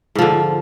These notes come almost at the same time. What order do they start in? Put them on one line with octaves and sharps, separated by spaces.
G#2 F3 D3